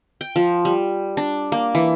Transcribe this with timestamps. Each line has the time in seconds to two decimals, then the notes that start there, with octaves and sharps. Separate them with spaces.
0.21 G5
0.36 F3
0.65 G3
1.17 D4
1.52 A#3
1.75 E3